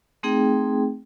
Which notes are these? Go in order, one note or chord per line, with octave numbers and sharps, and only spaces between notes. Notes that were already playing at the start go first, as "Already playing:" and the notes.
A3 C4 D#4 G#4 G5